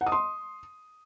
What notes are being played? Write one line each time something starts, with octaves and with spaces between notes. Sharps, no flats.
F#5
D#6
C6